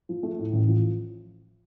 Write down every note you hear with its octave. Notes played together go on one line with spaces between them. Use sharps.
F3
A3
A2
A1
F3